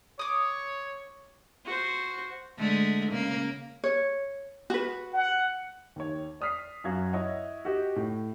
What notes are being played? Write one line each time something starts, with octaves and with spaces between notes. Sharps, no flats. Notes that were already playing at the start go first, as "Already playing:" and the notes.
C#5 D6 D#6
F#4 C5
D3 G#3 A3
C#3 A#3
C#5
F#4 B4
F#5
D#2 C#5
D5 D#6 F6 B6 C7
F#2 F#4 F5 G#6
E4 C#5 D#5 F#5
F#4 G4 D#5
A2